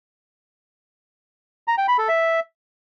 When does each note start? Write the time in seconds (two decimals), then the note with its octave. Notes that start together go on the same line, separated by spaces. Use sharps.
1.68 A#5
1.78 G5
1.88 B5
1.98 A4
2.09 E5